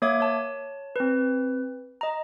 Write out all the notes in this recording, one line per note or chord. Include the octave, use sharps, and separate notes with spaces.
A#3 C#5 E5 D6 G#6
C#5 A5
C4 B4
D#5 A#5